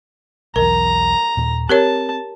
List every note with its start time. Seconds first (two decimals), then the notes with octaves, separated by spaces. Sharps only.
0.56 B1 E2 A#4 A#5
1.37 D#2 A#2
1.69 C4 G4 A#4 C#5 A5